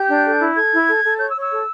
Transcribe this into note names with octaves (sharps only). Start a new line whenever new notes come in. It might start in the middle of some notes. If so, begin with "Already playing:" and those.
Already playing: G4 G6
D4
A4
E4
A4 G#6
E4
A4
A4
C#5 G6
E6
C#5
E6
A4